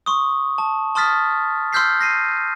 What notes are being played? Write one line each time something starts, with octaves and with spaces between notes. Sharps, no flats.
C6 C#6 D#6
A5
A5 C6 D#6 F6 A6 B6
C6 E6 F6 G6 B6 C7
A#6 C7 D#7